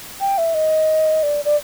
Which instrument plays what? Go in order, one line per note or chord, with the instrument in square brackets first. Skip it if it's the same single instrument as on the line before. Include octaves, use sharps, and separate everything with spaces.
[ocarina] G5
E5
D#5
D5
D5